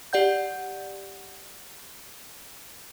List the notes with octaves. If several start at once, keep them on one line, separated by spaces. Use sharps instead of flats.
G4 D5 F#5 G6